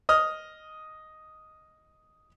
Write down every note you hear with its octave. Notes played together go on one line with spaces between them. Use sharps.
D#5 D#6 F6